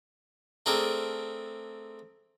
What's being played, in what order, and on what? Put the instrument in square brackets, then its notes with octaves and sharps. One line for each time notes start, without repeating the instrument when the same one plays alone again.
[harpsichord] A3 C4 D4 G#4 A#4